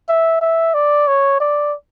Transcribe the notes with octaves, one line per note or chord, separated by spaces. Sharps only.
E5
E5
D5
C#5
D5